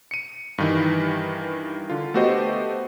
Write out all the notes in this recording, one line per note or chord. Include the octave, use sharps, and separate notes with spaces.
C#7 D#7
G2 D#3 E3
D3 F4
A3 B3 F#4 G4 C5 D#5